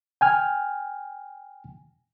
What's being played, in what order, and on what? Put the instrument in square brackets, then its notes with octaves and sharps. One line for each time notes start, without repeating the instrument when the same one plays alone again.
[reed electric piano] G5 G#5 F6